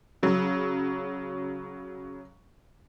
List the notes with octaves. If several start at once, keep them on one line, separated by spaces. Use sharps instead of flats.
C#3 F#3